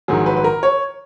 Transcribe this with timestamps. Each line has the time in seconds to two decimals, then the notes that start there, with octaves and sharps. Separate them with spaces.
0.08 A#1 G#2 D#3 F#3 G#4
0.26 B4
0.36 B4
0.44 A#4
0.63 C#5